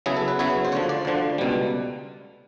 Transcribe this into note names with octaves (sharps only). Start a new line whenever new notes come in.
C#3 F#3 B3 E4 G#4
A4
B4
C#3 F#3 B3 E4 C#5
C5
D2 D3 F3 C#5
D5
D2 D3 F3
C#2 B2 G3